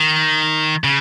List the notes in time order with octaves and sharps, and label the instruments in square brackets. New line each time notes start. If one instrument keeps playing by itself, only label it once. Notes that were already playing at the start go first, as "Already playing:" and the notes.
Already playing: [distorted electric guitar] D#3
C#3